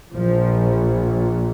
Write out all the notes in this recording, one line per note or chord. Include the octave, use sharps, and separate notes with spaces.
A#1 A#2 F3